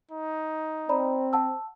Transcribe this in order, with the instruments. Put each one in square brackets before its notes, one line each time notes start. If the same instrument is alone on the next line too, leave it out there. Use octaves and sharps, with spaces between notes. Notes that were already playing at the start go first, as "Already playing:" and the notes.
[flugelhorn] D#4
[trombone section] C4 [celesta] D5 A#5 B5
[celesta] F#5 A5 E6